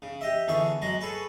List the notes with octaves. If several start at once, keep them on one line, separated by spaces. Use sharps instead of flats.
C#3
G4 D#5 E5
E2 D3 G#4 E5 C#6
F#3 G#3 A#5
G#4 A4 B4 C#5